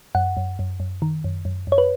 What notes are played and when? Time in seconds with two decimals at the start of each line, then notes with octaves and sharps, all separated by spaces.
0.15 F#2 F#5
0.37 F#2
0.59 F#2
0.80 F#2
1.02 D#3
1.24 F#2
1.45 F#2
1.67 F#2 C#5
1.78 B4